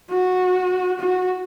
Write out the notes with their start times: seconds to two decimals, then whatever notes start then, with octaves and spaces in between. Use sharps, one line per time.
0.10 F#4
1.00 F#4